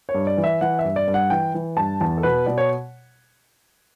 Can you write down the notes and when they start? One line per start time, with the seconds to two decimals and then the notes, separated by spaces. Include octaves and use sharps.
0.09 C#5
0.14 G2
0.27 D5
0.38 E3
0.44 E5
0.61 E3 F#5
0.79 E5
0.85 G2
0.96 D5
1.08 G2
1.14 F#5
1.30 E3 G5
1.54 E3
1.77 G2 A5
2.01 E2 A5
2.18 A4
2.23 B2 B4
2.46 B2 D5
2.58 C#5